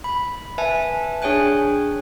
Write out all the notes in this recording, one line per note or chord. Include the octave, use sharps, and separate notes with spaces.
B5
B4 E5 G#5 A5
D4 G#4 C#5 G5 G#5 F#6